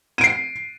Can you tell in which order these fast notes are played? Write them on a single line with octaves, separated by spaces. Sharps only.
D#7 D7 C7